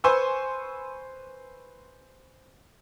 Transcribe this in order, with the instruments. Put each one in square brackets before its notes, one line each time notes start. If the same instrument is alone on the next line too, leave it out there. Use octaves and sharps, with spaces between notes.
[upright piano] B4 C5 G#5 C6 C#6 E6